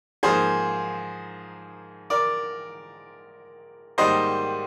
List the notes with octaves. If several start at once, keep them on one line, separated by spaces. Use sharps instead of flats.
G#2 F3 A#3 G#4 C5
A#4 D5
G#2 D#3 G3 A#3 C5 D#5